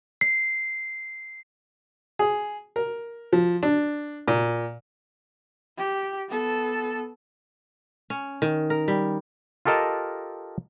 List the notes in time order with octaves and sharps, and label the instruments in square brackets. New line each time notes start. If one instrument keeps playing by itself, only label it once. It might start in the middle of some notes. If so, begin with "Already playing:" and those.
[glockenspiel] C7
[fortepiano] G#4
A#4
F3
D4
A#2
[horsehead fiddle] G4
B3 A4
[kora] C#4
D#3
A#4
G3
[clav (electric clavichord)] F4 G4 A4 A#4 D#5 A5